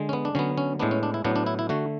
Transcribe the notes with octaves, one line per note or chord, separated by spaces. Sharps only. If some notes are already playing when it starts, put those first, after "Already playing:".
Already playing: D3 G#3
C#4
B3
D4
D3 F#3 B3 C#4
C#4
A2 G#3 B3 D4
C#4
D4
E4
A2 F#3 B3 D4
D4
E4
E4
D3 A3 F#4